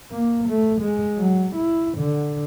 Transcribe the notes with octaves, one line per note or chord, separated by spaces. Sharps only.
A#3
A3
G#3
F#3
E4
D3